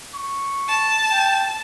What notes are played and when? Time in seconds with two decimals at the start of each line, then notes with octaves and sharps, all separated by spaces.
0.14 C#6
0.68 A5
1.11 G5